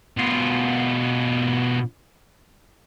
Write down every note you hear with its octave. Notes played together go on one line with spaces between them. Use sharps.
B2 F4